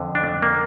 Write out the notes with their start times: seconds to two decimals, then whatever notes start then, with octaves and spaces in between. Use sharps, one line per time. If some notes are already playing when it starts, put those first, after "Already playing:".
Already playing: F2 D3
0.15 D4
0.42 A#3